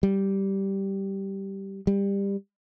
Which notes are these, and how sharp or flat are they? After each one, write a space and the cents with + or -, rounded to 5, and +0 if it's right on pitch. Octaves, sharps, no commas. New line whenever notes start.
G3 -10
G3 +20